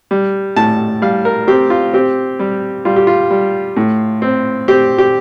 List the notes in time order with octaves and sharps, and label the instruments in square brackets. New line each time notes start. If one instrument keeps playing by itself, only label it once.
[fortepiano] G3
A2 A5
G3 F5
A#4
C4 G4
F4
C4 G4
G3
G3 F4
G4
F4
G3
A2
C4
C4 G4
G4